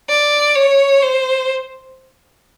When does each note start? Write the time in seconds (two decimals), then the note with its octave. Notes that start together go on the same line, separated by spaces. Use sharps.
0.09 D5
0.56 C#5
1.02 C5